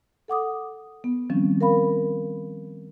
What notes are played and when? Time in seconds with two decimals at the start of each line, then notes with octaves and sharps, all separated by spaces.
0.28 A4 F#5 D6 D#6
1.04 B3
1.30 D#3 F3 G3 C4 C#4
1.61 A#4 F5 B5